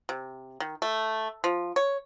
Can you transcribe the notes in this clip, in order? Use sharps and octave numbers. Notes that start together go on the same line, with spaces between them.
C3
D#3
A3
F3
C#5